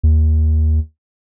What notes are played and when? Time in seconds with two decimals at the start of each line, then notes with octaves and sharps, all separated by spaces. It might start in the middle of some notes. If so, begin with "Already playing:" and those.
0.03 D#2